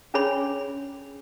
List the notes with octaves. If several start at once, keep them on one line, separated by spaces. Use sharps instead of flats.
C#4 D4 G#4 C#5 B5